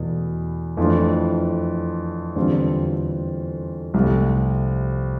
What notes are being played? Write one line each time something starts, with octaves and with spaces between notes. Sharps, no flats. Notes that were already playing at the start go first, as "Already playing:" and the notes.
Already playing: E2 B2 A3
F2 E3 A3 D4 F4
E2 D3 G3 C4 F4
C2 C3 F3 A3